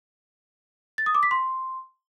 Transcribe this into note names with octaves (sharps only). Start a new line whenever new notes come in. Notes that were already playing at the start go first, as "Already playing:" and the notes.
A6
D#6
D6
B6
C6